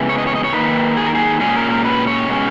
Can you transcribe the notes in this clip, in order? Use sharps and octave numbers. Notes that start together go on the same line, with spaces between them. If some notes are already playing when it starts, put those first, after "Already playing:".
Already playing: C#3 G#3 B3 E4
C#5
D#5
C#5
D#5
C#5
D#3 A#3 D#4 B4
G#4
A#4
G#4
A#2 G#3 C#4 G#4
A#4
A#4
B4
C#5
B2 G#3 C#4